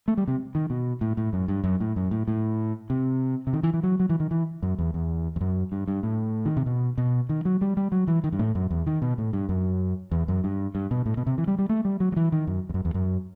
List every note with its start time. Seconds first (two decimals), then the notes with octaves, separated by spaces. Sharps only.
0.08 A3
0.17 G3
0.28 C3
0.55 D#3
0.70 B2
1.01 A2
1.17 A2
1.33 F#2
1.48 G2
1.64 F#2
1.80 A2
1.96 F#2
2.11 A2
2.28 A2
2.90 C3
3.47 C3
3.53 D#3
3.63 E3
3.74 E3
3.83 F#3
4.00 F#3
4.09 E3
4.20 D#3
4.31 E3
4.63 F#2
4.79 E2
4.94 E2
5.36 E2
5.41 F#2
5.72 G2
5.88 G2
6.03 A2
6.45 D#3
6.57 C3
6.66 B2
6.98 B2
7.29 D#3
7.45 F#3
7.61 G3
7.77 G3
7.92 F#3
8.08 E3
8.24 D#3
8.32 G2
8.39 A2
8.55 F#2
8.71 E2
8.87 D#3
9.02 B2
9.18 A2
9.33 G2
9.49 F#2
10.11 E2
10.28 F#2
10.44 G2
10.75 G2
10.91 B2
11.06 A2
11.17 B2
11.27 C3
11.38 E3
11.47 G3
11.59 G3
11.69 A3
11.85 G3
12.00 F#3
12.12 F#3
12.16 E3
12.32 D#3
12.47 F#2
12.69 E2
12.74 F#2
12.85 E2
12.94 F#2